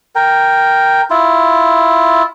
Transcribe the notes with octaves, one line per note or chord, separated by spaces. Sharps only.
A#4 G5
E4 F4